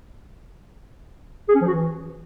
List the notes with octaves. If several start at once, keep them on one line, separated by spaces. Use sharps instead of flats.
G#4
C#4
F3
F#4
E3